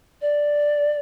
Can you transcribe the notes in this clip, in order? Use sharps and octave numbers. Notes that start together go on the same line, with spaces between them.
D5